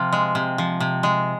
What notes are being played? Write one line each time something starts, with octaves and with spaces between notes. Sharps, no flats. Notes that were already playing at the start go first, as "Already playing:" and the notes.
Already playing: C3 F3 F4
G#3
C3
F3
C3
G#3